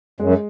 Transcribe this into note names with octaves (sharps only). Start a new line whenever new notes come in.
F#2 G#3